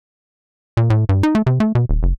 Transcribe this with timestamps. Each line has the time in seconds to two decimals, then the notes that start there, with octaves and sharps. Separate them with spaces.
0.77 A#2
0.90 A2
1.09 G2
1.23 D#4
1.35 A3
1.47 C3
1.60 A3
1.75 B2
1.89 D#1
2.03 F#1